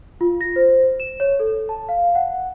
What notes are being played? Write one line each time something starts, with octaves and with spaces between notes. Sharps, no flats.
F4
A#6
C5
E7
C#5
A4
A5
F5
F#5